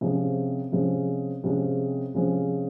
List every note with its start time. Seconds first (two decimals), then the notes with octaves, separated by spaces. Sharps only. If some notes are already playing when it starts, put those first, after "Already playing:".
0.01 C3 F3 G#3 C#4
0.72 C3 F3 G#3 C#4
1.44 C3 F3 G#3 C#4
2.14 C3 F3 G#3 C#4